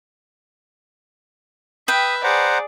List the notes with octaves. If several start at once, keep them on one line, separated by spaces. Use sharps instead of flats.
B4 E5 G5 D#6
G#4 C5 D5 F#5 A#5